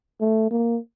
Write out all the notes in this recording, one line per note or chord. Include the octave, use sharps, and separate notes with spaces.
A3
A#3